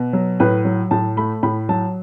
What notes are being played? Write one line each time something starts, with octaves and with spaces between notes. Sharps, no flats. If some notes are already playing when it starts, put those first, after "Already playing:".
Already playing: B2
F#3
A2 B4
F#3
A2 A5
A3 B5
A2 B5
F#3 A5